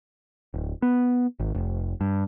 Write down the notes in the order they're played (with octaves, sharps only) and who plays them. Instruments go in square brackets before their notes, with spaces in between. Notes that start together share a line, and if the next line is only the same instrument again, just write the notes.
[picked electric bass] D1
B3
G#1
F1
G2